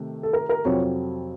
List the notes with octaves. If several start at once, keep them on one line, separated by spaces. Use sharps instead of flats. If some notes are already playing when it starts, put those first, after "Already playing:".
Already playing: C3 D#3 A3
A4
A#4
A#4
F2 C3 F#3 C4 F4 C#5